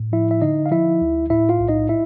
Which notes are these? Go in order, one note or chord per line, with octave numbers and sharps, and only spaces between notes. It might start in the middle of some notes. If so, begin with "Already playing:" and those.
Already playing: A2
F3 E4 E5
E5
D3 D#4 D#5
F5
F3 E4 E5
D2
A2 E4 E5
F4 F5
B1
D#4 D#5
E4 E5